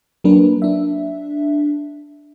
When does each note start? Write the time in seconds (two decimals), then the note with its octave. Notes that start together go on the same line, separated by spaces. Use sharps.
0.24 F#3 A#3 D4 A#4 B4
0.62 D4 E5